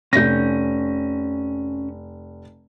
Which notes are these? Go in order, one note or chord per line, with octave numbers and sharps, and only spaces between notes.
F1 C#4 G6 A#6